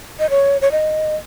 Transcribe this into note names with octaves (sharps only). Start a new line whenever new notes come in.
D#5
C#5
C#5
D#5